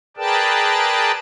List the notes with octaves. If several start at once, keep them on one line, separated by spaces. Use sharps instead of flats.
G#4 A#4 B4 D5 G5 A5